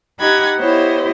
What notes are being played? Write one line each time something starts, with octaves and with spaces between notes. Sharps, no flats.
D#4 G4 F#5 B5 G#6
B3 E4 G4 C5 C#5 D#5